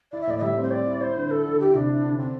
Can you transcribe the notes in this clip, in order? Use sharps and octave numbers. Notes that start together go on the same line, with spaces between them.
E4 D5
E5
A2 D5
D5
G3 E5
C4
C5
C4 D5
E4
E4 C5
D3
E4 A4
D3
E4 G4
C3 D4
E4
D3
C4 D4